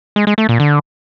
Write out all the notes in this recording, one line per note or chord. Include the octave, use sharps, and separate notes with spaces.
G#3
G#3
A3
A#2
D3